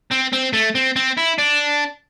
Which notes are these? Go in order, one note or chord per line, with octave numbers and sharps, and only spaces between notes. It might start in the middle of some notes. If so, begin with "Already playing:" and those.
C4
C4
A3
C4
C4
E4
D4